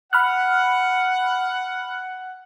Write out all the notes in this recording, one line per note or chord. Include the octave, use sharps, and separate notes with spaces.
F#5 B5 F6 F#6